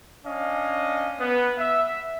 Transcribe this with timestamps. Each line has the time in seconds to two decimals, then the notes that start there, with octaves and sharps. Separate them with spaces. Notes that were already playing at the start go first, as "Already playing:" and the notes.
0.25 C#4 D4 D#5 F5
1.19 B3
1.58 E5